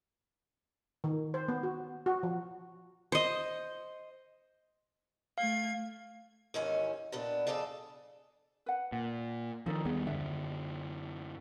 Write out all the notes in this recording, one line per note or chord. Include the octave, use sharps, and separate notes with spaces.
D#3
C5
B3
F#4
F#4
F3
C5 D#5
A3 F5 G#6
D#2 G#2 D#3 E3 C#4 G#5
A#2 B3 D4
F2 G#4 A4 D5 F5
B4 F#5
A#2
D#3 F3 D#4 A4 C#5
D#2 G3 B3 G#4
F#2 D3 E5